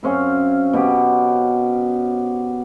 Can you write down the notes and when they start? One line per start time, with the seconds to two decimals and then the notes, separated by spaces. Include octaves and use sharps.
0.03 F#2 C4 C#4 F5
0.73 B2 F#4 G4